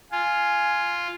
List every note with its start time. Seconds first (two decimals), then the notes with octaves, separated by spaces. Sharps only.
0.12 F4 G#5